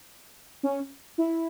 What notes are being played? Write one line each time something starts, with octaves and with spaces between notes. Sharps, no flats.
C#4
E4